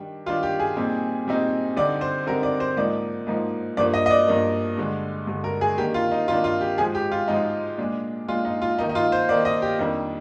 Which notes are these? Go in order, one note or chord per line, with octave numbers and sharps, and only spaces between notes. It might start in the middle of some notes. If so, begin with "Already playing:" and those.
Already playing: D#3 G3 D4
D#3 G3 D4 F4
G4
G#4
A#2 G3 C4 D#4
A#2 G3 C4 D#4
D3 G3 C4 D#4 D5
C5
D3 G3 C4 D#4 A#4
D5
C5
G#2 F3 A#3 D#4 D5
G#2 F3 A#3 D#4
G2 F3 A#3 D4 D5
D#5
D#5
D5
G2 F3 A#3 D4
G2 D3 G#3
G2 D3 G#3
A#4
G#4
D#3 A#3 D4 G4
F4
D#4
D#3 A#3 D4 F4
F4
G4
G#2 F3 G#3 G#4
G4
F4
G#2 F3 G#3 D#4
A#2 G#3 D4
A#2 G#3 D4 F4
D#4
F4
D#3 A#3 D#4
D#4
F4
C5
D#3 A#3 D#4 D5
D#5
G4
F2 D#3 G3 A#3 D4